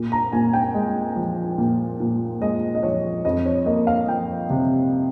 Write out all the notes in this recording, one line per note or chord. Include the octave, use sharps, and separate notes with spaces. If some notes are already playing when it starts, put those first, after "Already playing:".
Already playing: A#2
A#5
A#2 G#5
G5
G#3
F3
A#2
A#2
G#3 D#5
D#5
F3 C#5
F2 D#5
C#5
A#3 D#5
F5
F3 G5
C3